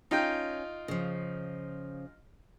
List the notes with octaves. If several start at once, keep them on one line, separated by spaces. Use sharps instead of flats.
C#4 D#4 F4 G5
C#3 F3